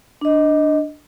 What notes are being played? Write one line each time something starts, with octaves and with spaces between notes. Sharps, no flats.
D4 D#5